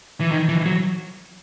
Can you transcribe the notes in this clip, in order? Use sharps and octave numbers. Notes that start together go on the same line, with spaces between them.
E3
D#3
E3
F#3